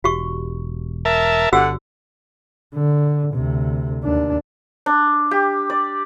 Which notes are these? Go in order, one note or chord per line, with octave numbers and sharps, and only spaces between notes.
E1 F#4 G4 C#6
A#4 E5 A5
G1 D3 F#4 G4 F#5 E6
D3
D2 C3
D#2 D4
D4
G4
D5